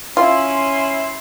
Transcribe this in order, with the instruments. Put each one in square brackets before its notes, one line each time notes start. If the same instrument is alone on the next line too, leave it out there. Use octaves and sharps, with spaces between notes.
[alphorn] C#4 [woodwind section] E4 C6 [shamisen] F4